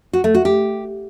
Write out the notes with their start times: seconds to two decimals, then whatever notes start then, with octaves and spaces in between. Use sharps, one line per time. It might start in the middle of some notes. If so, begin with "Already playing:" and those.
0.13 F#4
0.24 A3
0.35 F#4
0.45 G4